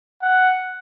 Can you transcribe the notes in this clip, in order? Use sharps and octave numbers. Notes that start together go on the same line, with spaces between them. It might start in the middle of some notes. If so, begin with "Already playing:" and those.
F#5